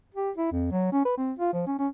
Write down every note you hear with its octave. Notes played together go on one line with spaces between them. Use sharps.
G4
E4
F2
F#3
C#4
B4
C4
F4
F3
C#4
C#4